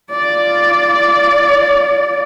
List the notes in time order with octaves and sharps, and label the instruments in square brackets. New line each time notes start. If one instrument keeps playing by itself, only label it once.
[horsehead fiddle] F4 D5